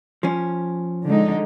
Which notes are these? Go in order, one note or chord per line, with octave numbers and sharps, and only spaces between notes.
F3 C#4
D3 G#3 D#4